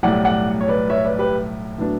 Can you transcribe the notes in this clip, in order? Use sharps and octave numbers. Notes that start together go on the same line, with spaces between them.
B1 A2 G3 D5 F#5
D5 F#5
C#5
B4 D5
C#5 E5
B4 D5
G4 B4
A2 F#3 B3 D4